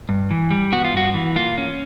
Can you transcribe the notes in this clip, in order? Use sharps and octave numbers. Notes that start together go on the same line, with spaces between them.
G2
E3
G3
B3 F#4
F4
G2 F#4
E3
A#3 F4
C#4